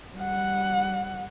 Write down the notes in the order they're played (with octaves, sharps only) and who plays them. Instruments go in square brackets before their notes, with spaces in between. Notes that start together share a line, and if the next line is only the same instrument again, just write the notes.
[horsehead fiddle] G3 F#5